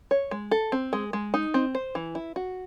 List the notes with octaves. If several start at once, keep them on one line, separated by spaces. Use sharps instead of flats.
C#5
G#3
A4
C4
G#3
G#3
D#4
C4
C5
E3
E4
F#4